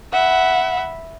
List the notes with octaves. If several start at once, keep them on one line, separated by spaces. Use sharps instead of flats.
E5 F#5 B5